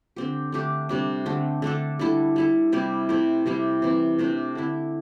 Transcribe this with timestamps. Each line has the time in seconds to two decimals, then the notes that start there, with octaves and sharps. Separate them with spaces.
0.16 D3 C4 G4
0.52 D3 A3 D4 G4
0.89 C3 G3 D4
1.26 D3 A3 C4
1.62 D3 A3 D4 A4
1.99 D3 G3 E4 A4
2.36 G3 E4 A4
2.72 C3 G3 E4 G4
3.09 C3 A3 E4 G4
3.46 C3 G3 E4 G4
3.82 C3 E3 C4
4.19 C3 A3 D4 G4
4.55 D3 C4 E4